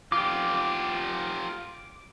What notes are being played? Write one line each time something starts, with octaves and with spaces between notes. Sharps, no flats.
F4 G4 D6